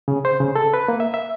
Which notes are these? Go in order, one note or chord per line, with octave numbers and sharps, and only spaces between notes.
C#3
C5
C#3
A4
B4
A#3
E5
E5